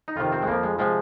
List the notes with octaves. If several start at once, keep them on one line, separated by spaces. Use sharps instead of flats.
D#4
F2 C3 D#3 F4
C4
G#3
F2 F3 A#3
G#3
C3 F3 G#3